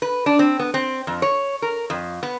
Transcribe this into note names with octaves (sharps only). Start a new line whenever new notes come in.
B4
D4
C4
B3
C4
F2
C#5
A#4
F2
B3